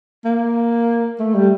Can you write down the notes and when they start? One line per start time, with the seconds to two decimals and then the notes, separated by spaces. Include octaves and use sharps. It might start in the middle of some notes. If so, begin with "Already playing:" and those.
0.25 A#3
1.20 A3
1.35 G3